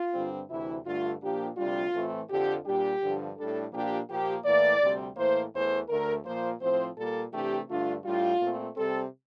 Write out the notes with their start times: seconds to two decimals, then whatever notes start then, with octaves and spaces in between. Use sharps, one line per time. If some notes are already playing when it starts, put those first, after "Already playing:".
Already playing: F4
0.13 G2 D3 G3 C4
0.49 D2 C3 E3 E4
0.85 G2 D3 A3 F4
1.22 A#2 F3 A#3 D4 G4
1.57 D2 C3 G3 D4 F4
1.93 A2 E3 A3 C4
2.29 F2 D3 F3 G4
2.65 A#2 G3 D4 G4
3.01 G2 D3 F3
3.37 A2 G3 D4 A4
3.72 A#2 F3 A#3 D4 G4
4.09 A#2 F3 A#3 G4
4.45 A2 E3 A#3 D5
4.81 D2 C3 G3 C4
5.16 A2 E3 A#3 C5
5.53 E2 E3 A3 C5
5.89 D2 D3 A3 D4 A#4
6.24 A#2 F3 A#3 C5
6.60 A2 F3 C4 C5
6.96 A#2 G3 A#3 A4
7.32 C3 E3 A3 D4 G4
7.68 G2 D3 A3 D4 F4
8.04 A2 G3 D4 F4
8.40 A#2 A3 C4
8.76 C3 G3 C4 A4